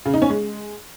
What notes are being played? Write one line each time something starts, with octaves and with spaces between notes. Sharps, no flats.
C#3
D#4
C#4
G#3